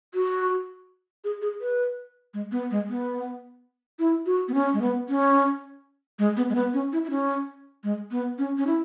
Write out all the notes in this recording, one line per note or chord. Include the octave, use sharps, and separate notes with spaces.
F#4
G#4
G#4
B4
G#3
B3
G#3
B3
E4
F#4
B3
C#4
G#3
B3
C#4
G#3
B3
G#3
B3
C#4
E4
E4
C#4
G#3
B3
C#4
C#4
E4